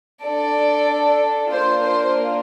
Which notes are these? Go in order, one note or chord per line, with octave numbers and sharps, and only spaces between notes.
D4 A4 D5
A#3 D4 F4 C5
C5